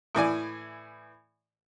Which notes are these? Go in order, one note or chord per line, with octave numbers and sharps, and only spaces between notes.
A2 E3 D5 G#5